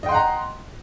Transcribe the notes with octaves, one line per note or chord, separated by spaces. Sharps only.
D#5 F#5 G5 A#5 C6